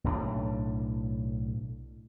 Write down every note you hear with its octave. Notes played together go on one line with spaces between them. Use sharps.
B1 A2 C4 D4